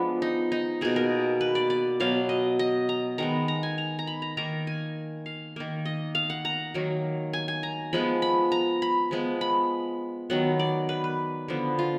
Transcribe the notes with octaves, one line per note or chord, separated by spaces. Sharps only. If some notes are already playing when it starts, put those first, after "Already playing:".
Already playing: F3 G#3 B3 D4
D#4
D#4
B2 A#3 G#4
A#4
B4
D5
D5
B2 F#3 B3 F5
D#5
D#5
A#5
D#3 G#3 B3 A#5
A#5
G#5
A#5
A#5
B5
A#5
D#3 A#3 A#5
G#5
F5
D#3 A#3
D#5
F5
F#5
A#5
D#3 F#3 A#3
G#5
G#5
A#5
F3 G#3 B3 B5
B5
A#5
B5
F3 G#3 B3
B5
D#3 F#3 B3 F#5
D5
B4
B4
D3 F3 B3
F4